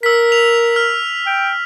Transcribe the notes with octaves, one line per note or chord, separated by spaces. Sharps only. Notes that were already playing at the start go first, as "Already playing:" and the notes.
A#4 E6 B6
F7
F6
G5